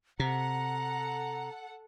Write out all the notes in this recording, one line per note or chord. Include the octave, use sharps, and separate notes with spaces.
C3 A4 F#5 A#5